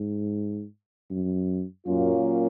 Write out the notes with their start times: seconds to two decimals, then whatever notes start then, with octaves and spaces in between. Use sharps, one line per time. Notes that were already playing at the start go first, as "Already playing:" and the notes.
Already playing: G#2
1.11 F#2
1.86 F#2 A#2 F#3 A#3 C#4 F4